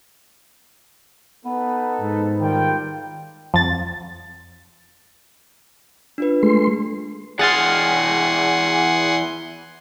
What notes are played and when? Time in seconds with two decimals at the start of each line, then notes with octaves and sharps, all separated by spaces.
1.45 B3 D#4 A4 B4
2.01 G#2
2.40 D#3 G3 F4 G5
3.54 F2 A6
6.18 D4 F4 B4
6.43 G#3 A3 C6
7.39 E2 G#4 F5 F#5 G#5 C6 A6